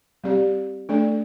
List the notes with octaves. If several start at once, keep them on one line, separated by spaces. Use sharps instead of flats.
G3 C4 G4 D5
A3 D4 A4 D5